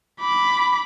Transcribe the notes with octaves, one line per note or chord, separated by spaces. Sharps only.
B5 D6